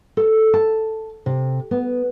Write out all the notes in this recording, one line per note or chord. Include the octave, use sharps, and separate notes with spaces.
A4
A5
C3
B3